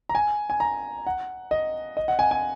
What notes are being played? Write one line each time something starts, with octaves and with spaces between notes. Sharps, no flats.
A#5
G#5
G#5
A#5
F#5
D#5
D#5
F#5
G#5
G#5